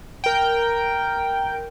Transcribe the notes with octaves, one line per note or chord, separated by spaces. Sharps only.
A#4 G5